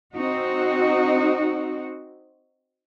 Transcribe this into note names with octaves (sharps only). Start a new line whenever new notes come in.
C4 D#4 F#4